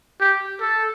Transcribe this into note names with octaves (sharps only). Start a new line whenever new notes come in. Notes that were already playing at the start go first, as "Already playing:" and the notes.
G4
A4